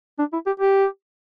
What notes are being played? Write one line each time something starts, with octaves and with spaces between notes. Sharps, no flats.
D4
E4
G4
G4